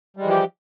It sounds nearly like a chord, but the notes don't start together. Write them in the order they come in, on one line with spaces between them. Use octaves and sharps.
G3 G#3 E3 F3 G4